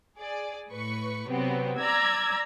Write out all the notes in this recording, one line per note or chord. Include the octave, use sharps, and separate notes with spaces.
G#4 D5
A2 B4 C#6
C3 F#3 B3 C4
D5 A#5 E6 G#6